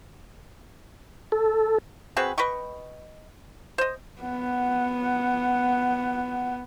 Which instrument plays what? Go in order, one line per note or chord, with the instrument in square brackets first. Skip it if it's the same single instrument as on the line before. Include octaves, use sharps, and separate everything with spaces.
[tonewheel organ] A4
[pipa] C4 F#4 G#4 B4
B4 D#5 G5 C#6
C5 D#5
[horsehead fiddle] B3 F#5